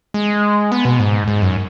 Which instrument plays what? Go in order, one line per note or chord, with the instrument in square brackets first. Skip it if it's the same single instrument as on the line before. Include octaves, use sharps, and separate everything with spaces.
[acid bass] G#3
B3
B2
G#2
G#2
F#2